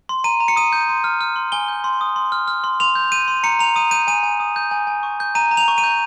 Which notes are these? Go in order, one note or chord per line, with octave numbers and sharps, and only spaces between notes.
C6
A#5 D#7
A#5
C#7
D#6 D#7
G6
C6
F6
F6
C6
G#5 G7
G6
C6
D#6
C6
F6
F6
C6
C6 F7
G6
G6 D#7
C6
A#5 C#7
A#5 F7
D#6 D#7
G6 D#7
G#5 D#7
G#5
D#6
G6
G#5
G#5
C#6
G6
A#5 D#7
A#5
F7
C#6
D#7
G6